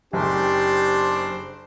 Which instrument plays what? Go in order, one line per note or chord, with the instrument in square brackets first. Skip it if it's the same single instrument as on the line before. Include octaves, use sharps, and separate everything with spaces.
[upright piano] F#1 [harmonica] D4 C5 [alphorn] G4